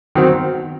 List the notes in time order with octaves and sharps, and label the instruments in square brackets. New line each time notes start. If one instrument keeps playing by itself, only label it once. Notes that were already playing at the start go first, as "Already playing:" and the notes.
[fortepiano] D#3 F#3 C4